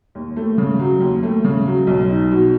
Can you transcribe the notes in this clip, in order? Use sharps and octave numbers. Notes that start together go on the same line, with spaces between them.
D#2
A3
C#3
F#3
D#2
A3
C#3
F#3
B1
D#4
B2